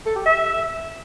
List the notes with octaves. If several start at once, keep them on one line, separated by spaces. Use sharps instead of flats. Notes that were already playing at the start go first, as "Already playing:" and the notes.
A4
G4
E5